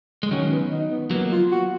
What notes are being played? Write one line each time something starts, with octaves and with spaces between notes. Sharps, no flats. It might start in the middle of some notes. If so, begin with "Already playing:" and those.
G#3
D#3 F#3 C#4
B3
D#4
B3
F#3 A#3 B3
F4
F#4